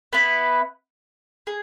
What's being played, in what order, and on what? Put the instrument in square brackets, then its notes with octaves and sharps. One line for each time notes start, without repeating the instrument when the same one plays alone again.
[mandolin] B3 E4 B4
G#4